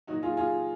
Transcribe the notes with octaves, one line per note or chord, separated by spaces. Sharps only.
A#2 F#3 D#4 F#4
F4 G#4
F4 G#4